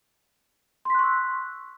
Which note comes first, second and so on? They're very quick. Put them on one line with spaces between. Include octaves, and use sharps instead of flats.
C6 B6 F#6 C#6 E6